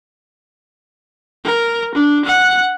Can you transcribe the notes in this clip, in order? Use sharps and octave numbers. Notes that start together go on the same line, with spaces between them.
A#4
D4
F#5